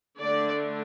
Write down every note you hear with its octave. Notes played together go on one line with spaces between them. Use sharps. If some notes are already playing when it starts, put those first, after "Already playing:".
D3 A3 D4 D5